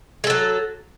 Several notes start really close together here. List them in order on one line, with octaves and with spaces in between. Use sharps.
G#3 A4 F#3